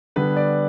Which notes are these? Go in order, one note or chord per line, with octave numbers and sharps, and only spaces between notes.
D3 G3 B3 B4
D5